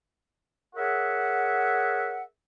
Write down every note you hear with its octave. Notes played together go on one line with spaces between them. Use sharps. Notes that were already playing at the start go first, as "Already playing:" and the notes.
G#4 A#4 C#5 E5 F#5